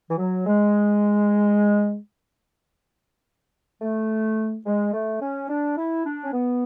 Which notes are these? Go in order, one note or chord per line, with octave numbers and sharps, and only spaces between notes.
E3
F#3
G#3
A3
G#3
A3
C#4
D4
E4
D4
C#4
B3